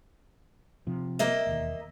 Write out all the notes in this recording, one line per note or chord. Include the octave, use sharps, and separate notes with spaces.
C3 F3
A#3 D#5 E5
E1 D#2